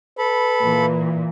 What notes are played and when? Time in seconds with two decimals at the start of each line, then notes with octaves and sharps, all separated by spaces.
0.19 A4 B4 B5
0.63 A#2 E3